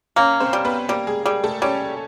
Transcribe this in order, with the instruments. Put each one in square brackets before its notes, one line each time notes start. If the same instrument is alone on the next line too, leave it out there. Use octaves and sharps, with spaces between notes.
[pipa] A#3 [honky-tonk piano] C#4 C#5
[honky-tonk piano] C4 C5
[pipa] G3
[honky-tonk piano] B3 B4
[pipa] G3 [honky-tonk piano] A#3 A#4
[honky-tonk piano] G#3 G#4
[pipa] G3 [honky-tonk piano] G#3 G#4
[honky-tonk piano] A3 A4
[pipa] G3 [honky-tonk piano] C#4 C#5